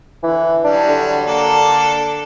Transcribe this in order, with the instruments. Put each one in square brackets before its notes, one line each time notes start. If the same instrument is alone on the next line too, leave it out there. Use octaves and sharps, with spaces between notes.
[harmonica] D3 [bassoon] E3
[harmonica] F#3 G3 [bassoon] D4
[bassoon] D3
[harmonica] A#3 D4 A4